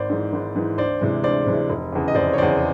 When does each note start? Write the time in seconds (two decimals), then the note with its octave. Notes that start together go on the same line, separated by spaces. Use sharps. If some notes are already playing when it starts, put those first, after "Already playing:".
Already playing: G#1 C5 D5
0.10 G#2 E3
0.33 G#1
0.56 G#2 E3
0.78 D2 C5 D5
1.01 C3 E3 G#3
1.23 D2 C5 D5
1.46 C3 E3 G#3
1.70 F1
1.92 E2 C#3
2.08 D#5
2.15 F1 C5 D5
2.33 C#5
2.38 E2 C#3 C5 D5